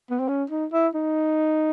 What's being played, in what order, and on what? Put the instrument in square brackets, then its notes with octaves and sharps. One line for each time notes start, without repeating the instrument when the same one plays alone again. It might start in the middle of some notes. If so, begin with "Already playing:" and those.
[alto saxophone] B3
C4
C#4
D#4
E4
D#4